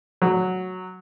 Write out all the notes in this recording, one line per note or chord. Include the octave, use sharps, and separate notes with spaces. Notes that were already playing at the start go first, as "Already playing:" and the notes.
F#3